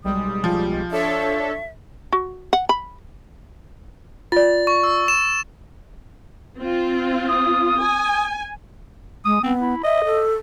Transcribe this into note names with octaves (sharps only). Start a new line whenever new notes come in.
B1 G3 G#3 D#6
F3
D4 A4 C#5 E5
F#4
F#5
B5
F4 D5 A6
C#6
E6
E7
C4 F4
D#6
G#5
G#3 D#6
B3 C4
E4
D#5 E5
A4